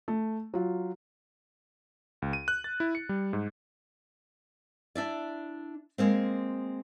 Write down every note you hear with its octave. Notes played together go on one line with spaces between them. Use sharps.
A3
F#3 F4
C#2
D#7
F#6
A6
E4
C#7
G3
G#2
D4 E4 D5
G#3 A#3 C4